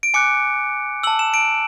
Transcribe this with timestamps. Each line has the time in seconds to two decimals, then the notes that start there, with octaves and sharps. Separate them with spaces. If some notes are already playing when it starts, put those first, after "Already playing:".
0.03 D7
0.14 G#5 D6 F#6 C#7
1.03 E6 F#7
1.07 A5
1.19 E7
1.34 D7